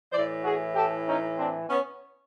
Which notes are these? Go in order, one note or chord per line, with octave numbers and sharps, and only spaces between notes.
E3 C5 D5
A2
F#4 G#4
G4 A4
C#4 D#4
C4 D4
B3 C#4